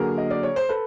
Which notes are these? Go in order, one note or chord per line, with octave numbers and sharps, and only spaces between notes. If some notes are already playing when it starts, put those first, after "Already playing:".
Already playing: D3 F#3 A#3 G#4 A#4
D#5
D5
C#5
C5
A4 B4